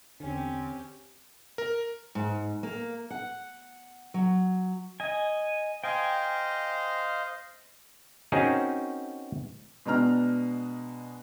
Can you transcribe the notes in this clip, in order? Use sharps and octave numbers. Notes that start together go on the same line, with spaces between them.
E2 D3 C4 C#4 G4
A#4
G#2
A#3
F#5
F#3
D#5 G#5
C5 D#5 F5 G5 G#5
C4 C#4 D#4 F#4 G#4 A#4
B2 G#3 B3 D4 A#5 F6